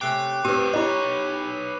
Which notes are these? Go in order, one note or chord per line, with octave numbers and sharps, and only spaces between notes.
C3 A3 C#4 G5 D6 F#6 C7
A2 B3 C4 G4 B4 D#7
G3 B3 E4 C#5 D#5 A#5